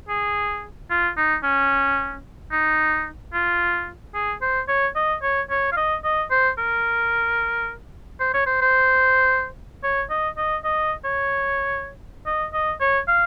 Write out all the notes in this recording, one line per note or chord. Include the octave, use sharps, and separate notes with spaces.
G#4
F4
D#4
C#4
D#4
F4
G#4
C5
C#5
D#5
C#5
C#5
F5
D#5
D#5
C5
A#4
C5
C#5
C5
C5
C#5
D#5
D#5
D#5
C#5
D#5
D#5
C#5
F5